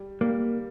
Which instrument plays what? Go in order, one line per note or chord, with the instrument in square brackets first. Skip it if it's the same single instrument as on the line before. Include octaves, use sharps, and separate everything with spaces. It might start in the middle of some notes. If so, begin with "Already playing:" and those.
Already playing: [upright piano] G3
[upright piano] G3 [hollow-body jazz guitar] A#3